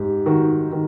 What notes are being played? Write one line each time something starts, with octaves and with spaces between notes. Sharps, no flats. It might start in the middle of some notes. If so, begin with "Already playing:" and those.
Already playing: G#2 G4
D#3 F#4
D#3